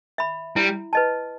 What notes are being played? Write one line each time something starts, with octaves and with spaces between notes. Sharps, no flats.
E5 B5
G3 E4
B4 D#5 A5